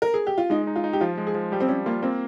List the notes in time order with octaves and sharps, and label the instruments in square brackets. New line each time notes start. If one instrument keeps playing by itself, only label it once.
[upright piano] A#4
G#4
G4
F4
[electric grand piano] G#3 [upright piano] D#4
[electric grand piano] D#4
[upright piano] F4
[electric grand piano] D#4
[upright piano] G4
[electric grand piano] F3 [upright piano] F4
[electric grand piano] G#3
[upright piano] G#4
[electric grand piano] F3
[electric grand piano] G3 [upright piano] G4
[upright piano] C4
[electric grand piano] G3 [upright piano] C#4
[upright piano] A#3 [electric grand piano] F4
[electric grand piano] A#3 [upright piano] C4